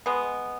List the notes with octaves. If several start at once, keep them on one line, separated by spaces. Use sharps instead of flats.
G#3 B3